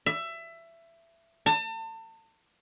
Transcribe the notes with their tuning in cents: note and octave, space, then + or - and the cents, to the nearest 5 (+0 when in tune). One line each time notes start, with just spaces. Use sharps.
E5 +20
A5 +35